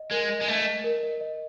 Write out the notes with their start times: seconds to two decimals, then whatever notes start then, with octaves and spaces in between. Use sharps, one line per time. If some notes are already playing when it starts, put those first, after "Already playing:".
Already playing: D#5
0.11 G#3 A#4
0.29 D#5
0.41 G#3
0.47 A3 D#5
0.66 D#5
0.84 A#4
1.03 D#5
1.21 D#5